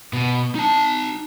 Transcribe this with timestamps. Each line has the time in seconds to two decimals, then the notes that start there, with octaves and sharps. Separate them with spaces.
0.13 B2
0.55 D#4 A5